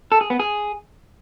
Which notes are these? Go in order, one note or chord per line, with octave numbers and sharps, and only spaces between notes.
A4
G#4
B3
G#4